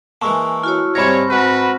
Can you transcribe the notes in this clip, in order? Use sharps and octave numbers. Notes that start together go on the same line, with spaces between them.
E3 G#3 A#3 A5 C#6 E6
E4 F#4 C#5 F6
G#2 C3 G3 C4 C5 C#5 B5 A#6
G#2 F#4 B4